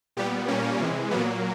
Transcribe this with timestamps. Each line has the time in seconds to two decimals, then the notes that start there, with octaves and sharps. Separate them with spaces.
0.17 A#2 G3 B3 G4
0.48 A#2 G3 A#3 C#4
0.80 C3 E3 G#3
1.11 A#2 F#3 A#3 B3